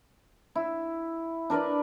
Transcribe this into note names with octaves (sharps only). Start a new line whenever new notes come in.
E4
D4 A#4 B4 D5